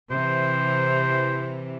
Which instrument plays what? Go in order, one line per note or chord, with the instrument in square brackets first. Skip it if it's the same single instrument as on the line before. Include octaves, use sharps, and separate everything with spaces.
[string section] C3 E3 [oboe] C5